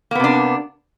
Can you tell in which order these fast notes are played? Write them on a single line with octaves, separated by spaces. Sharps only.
A#3 B3 C3 D4